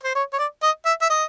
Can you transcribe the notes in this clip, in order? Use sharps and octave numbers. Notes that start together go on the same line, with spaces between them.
C5
C#5
C#5
D5
D#5
E5
E5
D#5